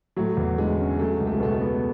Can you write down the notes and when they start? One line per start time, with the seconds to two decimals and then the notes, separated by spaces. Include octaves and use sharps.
0.17 A2 F#3
0.37 E2
0.58 D3 G#3
0.79 C#4
0.99 F#3 A3
1.20 C#2
1.27 A3
1.34 G#3
1.40 B2 A3
1.54 A3
1.61 B3